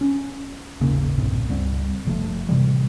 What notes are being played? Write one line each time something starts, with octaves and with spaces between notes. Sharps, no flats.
C#4
D#1 G#1 C#3 A#3
B1 G2 A#2 C4
C#2 G3 C4
F#1 F3 A3
A2 C3 E3 G3